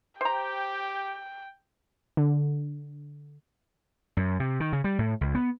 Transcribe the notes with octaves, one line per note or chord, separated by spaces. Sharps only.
G4 C5 G5 A#5
D3
F#2
C3
D#3
C#3
G3
A2
C#2
B3